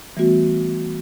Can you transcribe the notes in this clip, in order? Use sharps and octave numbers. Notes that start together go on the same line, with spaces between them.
E3 G3 A3 B3 F#4